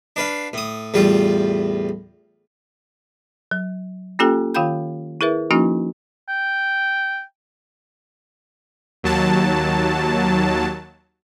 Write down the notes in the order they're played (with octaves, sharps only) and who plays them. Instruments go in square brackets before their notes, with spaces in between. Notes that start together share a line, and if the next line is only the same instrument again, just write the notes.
[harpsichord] D4 B4 F5
A2 D#6
E2 A2 G3 F4
[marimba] F#3
A#3 C#4 F4 G4 A4 G5
D#3 F4 F5 G5 B5 G6
E4 G#4 A#4 B4 E5
F3 A#3 C#4 D#4 E4 F#4
[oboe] G5
[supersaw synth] D#2 F#3 A5